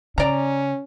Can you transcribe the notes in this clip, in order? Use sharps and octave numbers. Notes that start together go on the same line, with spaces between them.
C#3 C#4 D5 A#5